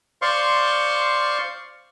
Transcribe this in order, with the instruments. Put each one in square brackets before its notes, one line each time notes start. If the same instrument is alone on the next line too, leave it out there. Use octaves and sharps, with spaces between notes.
[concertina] C5 D5 F5 C6 C#6